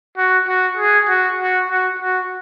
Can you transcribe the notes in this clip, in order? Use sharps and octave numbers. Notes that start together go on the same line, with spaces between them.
F#4
F#4
G#4
F#4
F#4
F#4
F#4